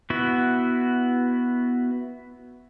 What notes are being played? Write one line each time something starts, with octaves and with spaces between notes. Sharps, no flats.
B3 E4 F#4